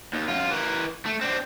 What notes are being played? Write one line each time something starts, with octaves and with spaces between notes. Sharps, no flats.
D#2
F#2 F4
E3 A#4
A3
C4 D4